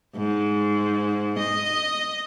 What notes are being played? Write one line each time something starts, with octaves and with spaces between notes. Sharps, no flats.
G#2
D#5